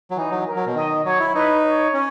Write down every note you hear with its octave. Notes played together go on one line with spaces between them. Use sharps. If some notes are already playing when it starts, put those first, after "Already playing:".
F#3
E3 D#4
F#3
A#4
F#3
B2
D#3 D#5
F#3 C#5
E4
D#4 B4
C#5
C#4